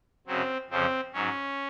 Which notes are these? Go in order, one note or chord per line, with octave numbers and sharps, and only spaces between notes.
F#2 C#3 F#3 C4
F2 C#3 F3 C4
G#2 F#3 C#4